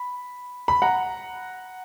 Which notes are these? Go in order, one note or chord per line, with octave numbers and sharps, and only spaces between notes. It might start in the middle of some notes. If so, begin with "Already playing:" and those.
Already playing: B5
B5
F#5 A#5